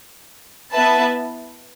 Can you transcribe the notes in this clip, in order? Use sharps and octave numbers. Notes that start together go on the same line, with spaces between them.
B3 E4 B4 E5 A5